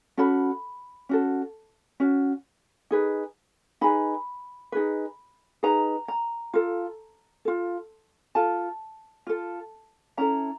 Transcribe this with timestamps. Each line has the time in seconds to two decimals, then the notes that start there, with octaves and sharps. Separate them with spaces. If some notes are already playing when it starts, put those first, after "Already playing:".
0.17 C#4 F#4 A4 B5
1.09 C#4 F#4 A4
2.00 C#4 F#4
2.91 D#4 G#4 B4
3.81 D#4 G#4 B4 B5
4.72 D#4 G#4 B4
5.63 D#4 G#4 B4 A#5
6.08 A#5
6.54 F4 A4
7.45 F4 A4
8.35 F4 A4 A5
9.27 F4 A4
10.17 C#4 E4 A4 A#5